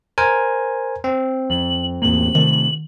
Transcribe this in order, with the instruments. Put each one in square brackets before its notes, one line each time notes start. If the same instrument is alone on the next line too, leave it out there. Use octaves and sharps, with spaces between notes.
[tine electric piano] A#4 C5 G#5
C4
[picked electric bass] F2 [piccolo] F#7
[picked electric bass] E2 A2 A#3 [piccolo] F#7
[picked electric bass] C3 A3 [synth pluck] D#3